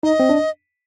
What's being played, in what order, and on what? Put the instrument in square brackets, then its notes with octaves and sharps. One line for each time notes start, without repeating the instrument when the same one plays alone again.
[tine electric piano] D#4 [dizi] D#5
[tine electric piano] C4
D4